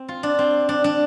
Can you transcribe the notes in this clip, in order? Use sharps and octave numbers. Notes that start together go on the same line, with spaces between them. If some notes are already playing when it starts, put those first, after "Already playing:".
Already playing: C4
F4
D4
C4
D4
D4